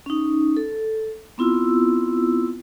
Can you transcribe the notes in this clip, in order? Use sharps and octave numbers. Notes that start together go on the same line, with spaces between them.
C#4 D#4
A4
B3 C4 E4 F4 E6